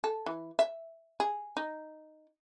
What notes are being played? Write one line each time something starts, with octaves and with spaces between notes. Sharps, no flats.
A4
E3
E5
G#4
D#4